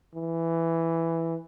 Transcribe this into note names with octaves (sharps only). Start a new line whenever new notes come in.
E3